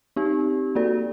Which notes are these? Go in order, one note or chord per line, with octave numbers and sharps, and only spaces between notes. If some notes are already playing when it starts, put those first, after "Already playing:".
C4 D#4 G4
A#3 F#4 A4 D5